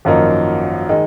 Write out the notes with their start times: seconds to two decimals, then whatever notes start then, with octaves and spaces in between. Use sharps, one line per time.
0.05 G#1 F#2 F3 A#3 D#4
0.89 D#3 G#3 D#4